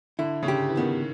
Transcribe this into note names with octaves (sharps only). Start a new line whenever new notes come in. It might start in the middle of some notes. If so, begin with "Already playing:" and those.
D3 E4
C#3
D3 G4
E3
D#3 B3